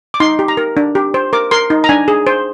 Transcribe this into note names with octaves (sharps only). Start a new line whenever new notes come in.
D6
D#4 C6
G4
A#5
A#4
D4
G4
C5
A#4 D6
A#4 C6
D#4
A#5
D4 G#5
G#4
C5